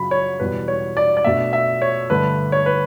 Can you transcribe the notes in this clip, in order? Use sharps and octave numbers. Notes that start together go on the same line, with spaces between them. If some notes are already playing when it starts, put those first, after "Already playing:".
Already playing: F#2 C#3 F#3 B5
C#5
E2 B2 G3 B4
C#5
D5
D5
B2 A3 D4 E5
E5
C#5
G2 D3 A3 D4 B4
C#5
B4